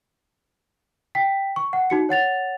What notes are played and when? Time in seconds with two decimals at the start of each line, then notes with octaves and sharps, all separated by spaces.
1.15 G5 B6
1.56 C#6
1.73 F#5
1.90 D#4 F#4 C#7
2.09 C#5 F#5 A6 F7